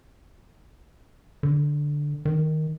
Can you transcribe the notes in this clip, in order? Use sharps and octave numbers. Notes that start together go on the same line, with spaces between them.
D3
D#3